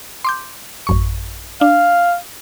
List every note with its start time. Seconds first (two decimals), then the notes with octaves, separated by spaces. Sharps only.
0.24 C6 D6 G6
0.87 A1 F#2 C#6
1.61 D4 F5